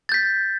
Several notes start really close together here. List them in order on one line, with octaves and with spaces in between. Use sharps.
A6 G6 B6